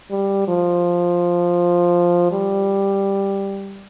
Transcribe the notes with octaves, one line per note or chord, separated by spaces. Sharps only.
G3
F3
G3